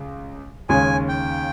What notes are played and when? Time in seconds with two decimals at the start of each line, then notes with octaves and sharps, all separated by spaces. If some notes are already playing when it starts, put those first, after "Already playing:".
Already playing: C#2
0.69 D#2 C#3 G#3 C#4 G#5
1.08 G5